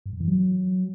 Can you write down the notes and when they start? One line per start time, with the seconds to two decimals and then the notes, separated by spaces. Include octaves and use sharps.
0.06 G2
0.13 F#2
0.20 E3
0.28 F#3